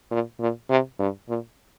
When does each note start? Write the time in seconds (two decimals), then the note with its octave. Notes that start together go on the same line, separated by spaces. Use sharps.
0.11 A#2
0.40 A#2
0.70 C3
0.99 G2
1.29 A#2